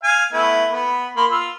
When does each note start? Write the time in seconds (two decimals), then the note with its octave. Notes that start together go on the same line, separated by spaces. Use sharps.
0.04 F5 G#5
0.33 A3 B3 E4
0.70 B3
1.17 A#3 B5 C6
1.31 F4 E6